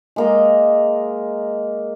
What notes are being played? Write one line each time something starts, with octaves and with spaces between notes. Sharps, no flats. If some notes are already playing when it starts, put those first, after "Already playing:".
G#3 A#3 D#5